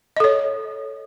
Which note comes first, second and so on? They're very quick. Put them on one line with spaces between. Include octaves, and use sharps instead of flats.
D#5 A4 C#5